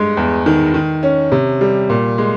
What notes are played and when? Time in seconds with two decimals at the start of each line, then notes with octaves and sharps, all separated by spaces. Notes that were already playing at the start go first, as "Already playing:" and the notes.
Already playing: G2 G#3
0.17 E2
0.46 D#3
0.74 D#3
1.03 C#4
1.32 C3
1.61 G3
1.90 A#2
2.18 G#3